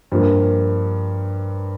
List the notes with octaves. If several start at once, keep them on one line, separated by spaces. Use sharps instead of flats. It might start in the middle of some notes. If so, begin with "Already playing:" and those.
G2 F3 A#3